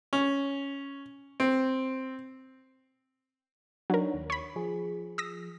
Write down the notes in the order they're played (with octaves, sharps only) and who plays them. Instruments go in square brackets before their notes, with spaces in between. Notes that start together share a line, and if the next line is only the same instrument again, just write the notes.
[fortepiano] C#4
C4
[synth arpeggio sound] F#3 A#4 [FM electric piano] D4 D#4 C#5
[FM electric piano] D#2
[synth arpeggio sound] C#5 B5
[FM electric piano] F3 G#4
[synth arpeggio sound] D#6 E6 A#6